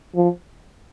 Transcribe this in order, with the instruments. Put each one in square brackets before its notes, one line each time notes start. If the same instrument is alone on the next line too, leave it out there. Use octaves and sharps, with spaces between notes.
[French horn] F3